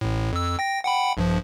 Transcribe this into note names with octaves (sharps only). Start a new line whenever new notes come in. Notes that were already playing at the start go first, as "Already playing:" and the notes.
A1 A2
F2 E6
G5 A#6
F#5 G5 B5
A#1 G2 F3